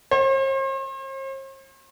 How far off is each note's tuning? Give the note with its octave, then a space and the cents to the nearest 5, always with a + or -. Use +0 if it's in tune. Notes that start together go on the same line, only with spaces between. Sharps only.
C5 +45